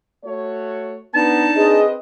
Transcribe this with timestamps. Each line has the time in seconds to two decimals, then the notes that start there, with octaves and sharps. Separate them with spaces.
0.25 A3 F#4 C#5
1.15 B3 D4 D#4 A5
1.56 C4 G#4 B4 D#5